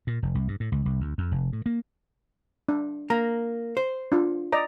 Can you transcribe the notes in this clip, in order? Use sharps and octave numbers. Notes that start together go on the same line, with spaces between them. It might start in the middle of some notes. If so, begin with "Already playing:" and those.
A#2
F1
C2
G2
A2
C#2
C2
D2
F2
F1
A2
A#3
D4
A#3 A#5
C5
D4 F4
D5 D#5 A#5